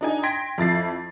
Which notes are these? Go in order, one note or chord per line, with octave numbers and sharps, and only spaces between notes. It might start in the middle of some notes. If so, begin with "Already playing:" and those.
D4 D#4 G#5
G5 C6 G#6 A#6 B6 D7
F2 E4 A6 C7